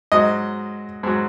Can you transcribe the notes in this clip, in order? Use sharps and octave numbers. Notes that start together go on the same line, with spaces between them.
G#2 F#3 D#5
G#2 F#3